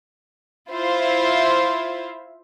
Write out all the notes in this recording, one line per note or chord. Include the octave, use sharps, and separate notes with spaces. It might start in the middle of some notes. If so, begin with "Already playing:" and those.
E4 F4 C5 E5 F5